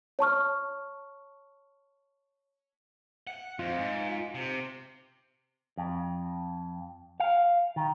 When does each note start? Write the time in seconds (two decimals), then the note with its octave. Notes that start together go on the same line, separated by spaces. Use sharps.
0.19 C#5 A5 C#6 F6
3.27 F#5
3.59 F2 F4
3.78 G#2
4.35 C3
5.77 F2
7.20 F5
7.76 D#3